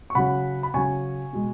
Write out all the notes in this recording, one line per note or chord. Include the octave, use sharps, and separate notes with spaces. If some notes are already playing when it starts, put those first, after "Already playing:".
C#6
C#3 F#3 F#5 B5
B5
C#3 F#3 G#5 C#6
B2 G#3